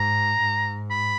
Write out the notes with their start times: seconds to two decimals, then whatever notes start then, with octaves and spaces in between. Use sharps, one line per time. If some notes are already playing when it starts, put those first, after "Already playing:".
Already playing: G#2 A#5
0.41 G#2
0.91 B5